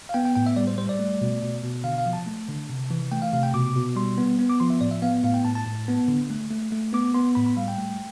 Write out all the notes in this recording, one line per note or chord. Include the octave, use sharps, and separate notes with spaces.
F5
B3 G5
G5
A2 G5
E5
G3 D5
C5
G3 C5
D5
A3
B2
B2
B2
D3 F5
F5
F3
A5
A3
D3
C3
E3
A3 G5
F5
C3 F5
G5
B2 D6
B2
G3 C6
B3
B3
D6
F3 C6
E5
A2 D5
E5
B3 F5
A2 F5
G5
A2 A5
A5
A2
B3
D3
A3
A3
A3
B3 D6
B3 C6
A2 B5
B5
G3 F5
G5
A3